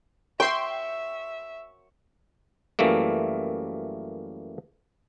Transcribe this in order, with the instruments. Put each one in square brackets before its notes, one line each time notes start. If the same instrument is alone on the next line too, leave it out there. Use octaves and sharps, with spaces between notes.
[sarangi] E5 [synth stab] G5 C6 [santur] C#6
[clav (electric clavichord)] F#2 E3 G3 A3 A#3